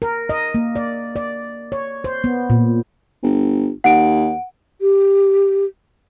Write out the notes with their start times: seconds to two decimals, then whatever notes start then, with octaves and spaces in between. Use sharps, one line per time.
0.02 A#4
0.29 D#5
0.54 A#3
0.76 D5
1.16 D5
1.72 C#5
2.04 C5
2.24 B3
2.50 A#2
3.23 G1
3.84 D#2 F#5 D7
4.81 G4